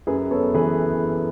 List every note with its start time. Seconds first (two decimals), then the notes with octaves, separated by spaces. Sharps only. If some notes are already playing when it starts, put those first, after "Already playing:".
0.07 F#2 G#4 B4
0.31 B3 A4 C#5
0.54 E3 G#4 B4